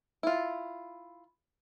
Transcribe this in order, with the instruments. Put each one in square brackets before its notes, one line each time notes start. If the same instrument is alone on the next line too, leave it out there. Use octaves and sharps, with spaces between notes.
[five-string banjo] E4 F4